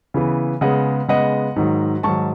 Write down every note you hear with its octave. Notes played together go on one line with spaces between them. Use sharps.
C#3 E3 B3
C#3 G#3 B3 D#5 F#5
C#3 G#3 B3 D#5 F#5
G#2 D#3 F#3
G#2 D#3 F#3 A5 C#6